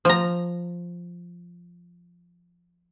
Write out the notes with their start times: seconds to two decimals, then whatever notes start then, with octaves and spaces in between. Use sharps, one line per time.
0.05 F3 A#5